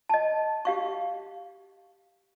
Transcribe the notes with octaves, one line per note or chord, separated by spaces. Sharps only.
D#5 A5
G4 F5 C#6